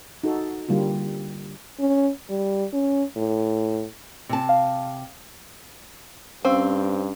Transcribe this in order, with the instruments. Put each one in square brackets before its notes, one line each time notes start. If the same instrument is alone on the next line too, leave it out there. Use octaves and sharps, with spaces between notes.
[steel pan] D#4 F#4 A4
D3 G3 A#3 F4
[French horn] C#4
G3
C#4
A2
[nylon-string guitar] C3 A5
[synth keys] F5
[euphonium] G2 [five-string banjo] C4 [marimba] C#4 F5 E6